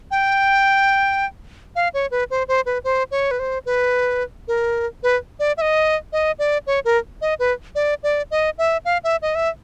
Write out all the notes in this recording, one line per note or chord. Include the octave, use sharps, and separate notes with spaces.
G5
F5
C#5
B4
C5
C5
B4
C5
C#5
B4
C5
B4
A#4
B4
D5
E5
D#5
D#5
D5
C#5
A#4
D#5
B4
D5
D5
D#5
E5
F5
E5
D#5
E5